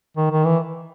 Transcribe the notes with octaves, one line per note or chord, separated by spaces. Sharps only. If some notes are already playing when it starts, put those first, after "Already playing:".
D#3
D#3
E3